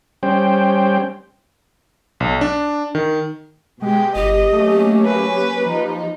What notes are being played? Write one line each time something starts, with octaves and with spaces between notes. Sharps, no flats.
G3 C#4 C5 G5
B1
D4
D#3
B2 G#3 G4
G1 G4 D#5
F#3 A3 A#3 C#4
B4
F3 D#4